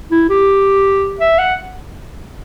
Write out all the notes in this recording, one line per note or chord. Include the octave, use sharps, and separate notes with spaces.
E4
G4
E5
F#5